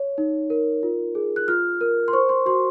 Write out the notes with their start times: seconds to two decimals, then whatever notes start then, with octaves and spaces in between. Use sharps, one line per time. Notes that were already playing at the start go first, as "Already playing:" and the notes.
Already playing: C#5
0.18 D#4
0.50 A#4
0.83 F4
1.15 G#4
1.36 F#6
1.48 F4 F6
1.81 A#4
2.08 C6
2.13 C5 C#6
2.29 C6
2.46 F#4 C6